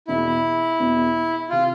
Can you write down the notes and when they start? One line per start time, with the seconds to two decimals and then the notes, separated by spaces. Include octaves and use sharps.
0.07 E1 E2 B2 B3 E4
0.79 E1 E2 B2 B3
1.50 C3 F4